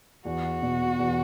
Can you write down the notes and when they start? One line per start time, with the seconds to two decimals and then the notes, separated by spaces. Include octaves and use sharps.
0.25 E2 F#4
0.62 B2
0.99 E2